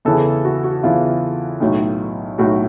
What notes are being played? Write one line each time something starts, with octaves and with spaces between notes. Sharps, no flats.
E2 C#3 E3 A4
F#4
F#4
E2 C#3 E3 F4
B1 A2 F#3
B1 A2 F#3 F#4